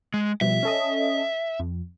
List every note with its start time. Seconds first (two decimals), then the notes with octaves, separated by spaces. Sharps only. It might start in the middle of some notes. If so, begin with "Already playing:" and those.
0.14 G#3
0.41 B2 F3 G3 E5
0.63 C#4 A4 D#5
1.59 F2